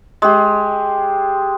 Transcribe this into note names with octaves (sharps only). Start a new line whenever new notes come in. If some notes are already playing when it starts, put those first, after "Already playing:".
G#3 G4